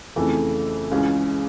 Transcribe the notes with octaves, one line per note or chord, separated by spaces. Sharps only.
F2 C#3 E3 A3
C#2 C#3 E3 G#3 C#4